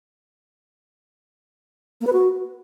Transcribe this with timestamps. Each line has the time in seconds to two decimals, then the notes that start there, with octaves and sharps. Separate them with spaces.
2.01 A#3
2.07 B4
2.13 F#4